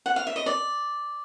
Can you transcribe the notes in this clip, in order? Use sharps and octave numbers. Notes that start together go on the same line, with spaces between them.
F#5
F5
E5
D#5
D5